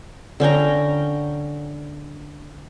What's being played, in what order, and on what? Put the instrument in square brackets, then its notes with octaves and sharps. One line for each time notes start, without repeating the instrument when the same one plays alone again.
[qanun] D3 C#4 G5 A#5